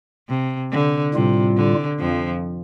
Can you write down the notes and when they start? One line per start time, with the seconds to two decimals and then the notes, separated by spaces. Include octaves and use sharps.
0.29 C3
0.72 D3
1.14 A2 C3 G3 F4
1.57 D3
1.99 F2 F3